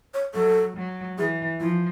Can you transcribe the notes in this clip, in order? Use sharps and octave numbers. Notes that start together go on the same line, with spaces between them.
C#5
F#3 A4
F#3
E3 G#4
F3 E4